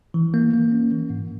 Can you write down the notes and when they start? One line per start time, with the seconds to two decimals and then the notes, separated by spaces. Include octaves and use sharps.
0.14 E3
0.34 A#3
0.53 A#3
0.72 C#4
0.91 E3
1.10 G#2